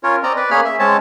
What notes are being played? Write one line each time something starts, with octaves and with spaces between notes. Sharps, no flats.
C#4 F4 A#4 C#5
C4 D5 D#5 A#5
B4 D5
A#3 C#4 G#4 C#5 B5 F6
E5
G#3 C4 C#4 C#5 A5